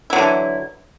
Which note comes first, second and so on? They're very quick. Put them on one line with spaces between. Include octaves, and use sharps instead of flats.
E4 F#3 D3 E3